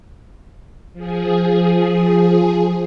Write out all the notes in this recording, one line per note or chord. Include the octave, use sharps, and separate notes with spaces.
F3 G#4